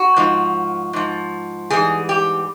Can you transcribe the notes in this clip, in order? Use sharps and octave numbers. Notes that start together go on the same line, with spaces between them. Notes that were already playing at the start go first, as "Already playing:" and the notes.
Already playing: F#4
G#2 F3
G#2 F3
G#2 E3 G3 G#4
G4